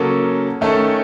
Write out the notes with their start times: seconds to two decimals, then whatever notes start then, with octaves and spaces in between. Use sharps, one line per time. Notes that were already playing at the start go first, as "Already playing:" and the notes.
Already playing: C#3 F#3 A#3 C#4 A4
0.61 D#3 A3 C#4 A4